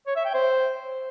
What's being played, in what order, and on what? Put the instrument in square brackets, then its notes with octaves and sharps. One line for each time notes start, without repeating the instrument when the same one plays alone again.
[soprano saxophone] C#5
E5
G5
C5